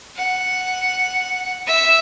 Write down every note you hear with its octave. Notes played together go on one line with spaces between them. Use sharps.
F#5
E5